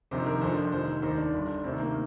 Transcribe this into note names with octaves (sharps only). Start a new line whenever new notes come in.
G1 F2 C3 D#3 C5
A#4
G1 F2 D3 F3 C5
F1 F2 D#3 C5
D#2 D#3 C5
D4
G1 G2 D3
D2 C3 D#3 C4
A#3